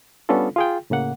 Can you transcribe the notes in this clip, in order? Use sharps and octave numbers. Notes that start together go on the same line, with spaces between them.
G3 B3 C#4 D4 F4 A4
F4 G#4 G5
A2 C#3 A#3 F#5